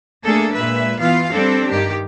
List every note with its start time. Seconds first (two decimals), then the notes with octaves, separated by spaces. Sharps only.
0.24 A3 A#3 D4 G#4 A4
0.52 A#2 G#3 B4 E5
1.00 E3 B3 F4 F5
1.32 G3 C4 D4 A4
1.68 G2 D#3 G4